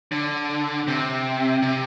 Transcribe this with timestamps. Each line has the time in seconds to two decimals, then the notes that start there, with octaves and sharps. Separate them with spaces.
0.12 D3
0.87 C3
1.62 C3